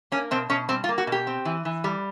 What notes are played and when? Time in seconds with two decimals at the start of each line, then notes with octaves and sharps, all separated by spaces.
0.12 A#3 C#4
0.31 B2 C4
0.50 B2 C#4
0.69 G3 C4
0.84 F4
0.89 A#3
0.98 F#4
1.07 B2 G4
1.27 C4
1.45 E3
1.65 E3
1.84 G3